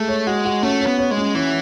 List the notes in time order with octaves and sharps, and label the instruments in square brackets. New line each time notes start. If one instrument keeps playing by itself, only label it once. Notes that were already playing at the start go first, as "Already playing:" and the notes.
Already playing: [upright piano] G#3 [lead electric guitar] A3
[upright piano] C#5
[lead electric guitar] G#3 [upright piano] F#4
[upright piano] F#4
[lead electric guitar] A3 [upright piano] C#4
[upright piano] C#5
[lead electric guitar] B3
[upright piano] C#5
[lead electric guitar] G#3
[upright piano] C#4
[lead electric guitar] E3 [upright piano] C#4